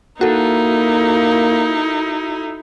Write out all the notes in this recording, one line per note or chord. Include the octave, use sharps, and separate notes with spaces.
A#3 D#4 E4 F#4 A4